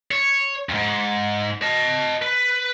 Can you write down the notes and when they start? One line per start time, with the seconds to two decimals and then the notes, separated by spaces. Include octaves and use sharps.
0.11 C#5
0.69 F2 G#2
1.62 D#5 A5
2.22 B4